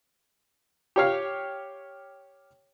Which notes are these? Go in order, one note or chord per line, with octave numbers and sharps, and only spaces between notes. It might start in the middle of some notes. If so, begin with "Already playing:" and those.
G4 C#5 F5